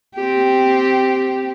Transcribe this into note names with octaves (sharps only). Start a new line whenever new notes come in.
C4 G4